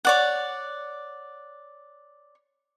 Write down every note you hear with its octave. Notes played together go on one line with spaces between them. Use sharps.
C#5 D5 F#5